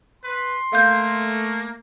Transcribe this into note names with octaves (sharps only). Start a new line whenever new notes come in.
B4 C6
A3 A#3 F5 G6